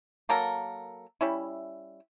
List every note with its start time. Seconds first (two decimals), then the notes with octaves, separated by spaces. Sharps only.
0.29 F#3 A#3 A4 A#4
1.21 G3 C#4 E4